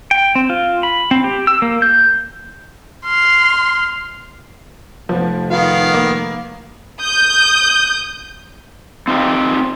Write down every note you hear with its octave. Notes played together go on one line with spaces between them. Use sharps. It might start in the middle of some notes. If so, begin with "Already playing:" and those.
G5
C4
F4
B5
C4
G4
E6
A#3
G6
C6 F6
F1 F3 B3
D#3 B3 F4 F5
A#3
D#6 G6
C4 D#4 F4 G4